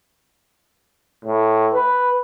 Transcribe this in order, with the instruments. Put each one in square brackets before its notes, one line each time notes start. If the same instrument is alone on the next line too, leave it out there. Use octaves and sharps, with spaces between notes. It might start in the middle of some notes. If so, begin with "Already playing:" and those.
[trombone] A2
B4